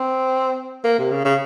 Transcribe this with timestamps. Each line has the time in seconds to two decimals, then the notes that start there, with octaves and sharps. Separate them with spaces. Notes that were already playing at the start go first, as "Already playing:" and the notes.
Already playing: C4
0.84 A#3
0.99 C3
1.11 C#3
1.25 C#3